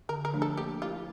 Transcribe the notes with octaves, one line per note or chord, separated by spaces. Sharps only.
D3 A#4
A#4
F3 A3 D4
A4
A#3 G4
E4 F4 G4 A#4